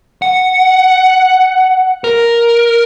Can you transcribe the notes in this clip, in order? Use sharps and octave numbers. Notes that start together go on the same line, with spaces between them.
F#5
A#4